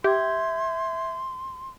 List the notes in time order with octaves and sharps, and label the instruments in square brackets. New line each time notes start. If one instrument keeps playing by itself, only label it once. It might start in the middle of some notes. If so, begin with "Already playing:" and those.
[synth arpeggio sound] G4 [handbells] E5 G6 G#6 [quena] C6